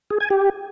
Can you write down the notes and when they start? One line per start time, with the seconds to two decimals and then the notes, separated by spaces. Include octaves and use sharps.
0.10 G#4
0.20 G#5
0.30 G4